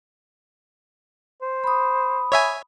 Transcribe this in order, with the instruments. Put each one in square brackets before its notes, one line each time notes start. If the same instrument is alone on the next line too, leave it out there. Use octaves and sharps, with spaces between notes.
[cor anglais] C5
[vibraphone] B5 D#6
[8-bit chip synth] C#5 E5 G#5